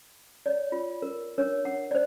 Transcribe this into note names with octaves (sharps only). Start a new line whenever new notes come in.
C#5 D5
F4
A#4
D4 A#4 C#5
F#5
C5 D5